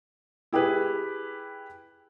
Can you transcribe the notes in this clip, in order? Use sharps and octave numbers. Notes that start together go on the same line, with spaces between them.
E4 G4 G#4 B4